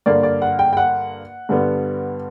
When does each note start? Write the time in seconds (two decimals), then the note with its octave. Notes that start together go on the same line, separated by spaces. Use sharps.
0.06 G2 D3 A#3 D5
0.23 D5
0.42 F#5
0.59 G5
0.73 G5
0.77 F#5
1.49 G2 D3 G3 B3